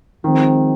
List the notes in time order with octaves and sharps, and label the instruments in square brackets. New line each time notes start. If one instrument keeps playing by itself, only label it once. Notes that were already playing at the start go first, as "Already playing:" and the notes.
[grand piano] D#3 [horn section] F3 G#3 C4